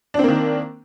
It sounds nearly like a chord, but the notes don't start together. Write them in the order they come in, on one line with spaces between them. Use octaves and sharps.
D4 C4 A#3 D#3